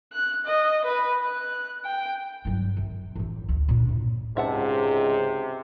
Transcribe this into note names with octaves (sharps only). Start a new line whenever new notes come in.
F#6
D#5
B4
F#6
G5
G2 F#3
F#2
A1 E3
D2
A#2 D4
A2
C#2 G#2 C3 E5 F#5 A5